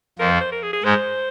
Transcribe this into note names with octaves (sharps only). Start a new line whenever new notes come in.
F2 F3 A#4
C5
C5
A#4
G#4
G#4
G#2 G#3 C5